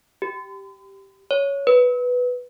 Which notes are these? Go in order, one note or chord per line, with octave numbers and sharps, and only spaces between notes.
G4
C#5
B4